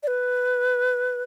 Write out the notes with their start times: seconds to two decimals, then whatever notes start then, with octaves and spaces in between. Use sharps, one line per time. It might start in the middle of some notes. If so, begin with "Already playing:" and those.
0.03 D5
0.07 B4